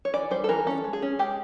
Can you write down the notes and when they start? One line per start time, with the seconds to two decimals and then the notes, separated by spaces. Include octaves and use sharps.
0.05 C#5
0.14 E3 D5
0.31 G3 C5
0.44 A4
0.49 E3 A#4
0.67 C#4 A4
0.84 G#3
0.93 G#4
1.02 C#4
1.19 G#3 G4